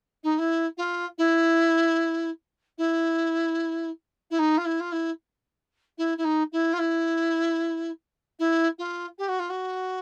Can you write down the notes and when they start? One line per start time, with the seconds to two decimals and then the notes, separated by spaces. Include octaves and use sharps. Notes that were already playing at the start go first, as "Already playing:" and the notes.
0.23 D#4
0.38 E4
0.77 F4
1.18 E4
2.78 E4
4.30 E4
4.39 D#4
4.58 F4
4.65 E4
4.80 F4
4.92 E4
5.98 E4
6.17 E4
6.24 D#4
6.52 E4
6.73 F4
6.79 E4
8.39 E4
8.78 F4
9.18 G4
9.28 F#4
9.39 F4
9.50 F#4